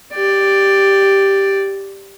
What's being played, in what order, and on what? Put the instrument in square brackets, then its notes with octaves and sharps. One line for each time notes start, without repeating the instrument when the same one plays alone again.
[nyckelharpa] G4 D5